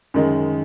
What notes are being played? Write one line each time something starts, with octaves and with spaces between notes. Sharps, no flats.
F#2 D#3 G#3 D#4